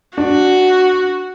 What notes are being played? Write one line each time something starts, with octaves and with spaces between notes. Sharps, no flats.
D4 F#4